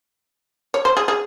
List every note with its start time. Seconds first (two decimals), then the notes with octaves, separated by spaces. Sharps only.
0.74 C#5
0.85 C5
0.97 G#4
1.08 G#4